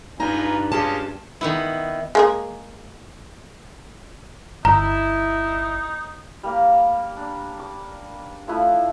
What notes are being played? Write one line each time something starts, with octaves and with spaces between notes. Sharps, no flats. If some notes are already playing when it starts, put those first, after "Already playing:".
G2 D#4 F4 B4 G#5 A#5
G#3 C#4 F4 G4 A5
D#3 B3 E4
G#3 A#3 G#4
G1 D#4 E4 A#5
G3 A#3 G4
D4
D6
F3 A3 E4 B4